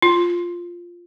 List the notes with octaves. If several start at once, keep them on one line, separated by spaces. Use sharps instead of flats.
F4